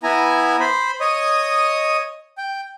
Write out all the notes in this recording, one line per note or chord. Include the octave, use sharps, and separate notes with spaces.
B3 E4 G#5 A#5
C5 B5
C#5 D#5 D#6
G5